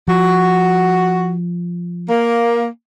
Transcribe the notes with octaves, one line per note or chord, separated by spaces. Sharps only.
F3 F#4
A#3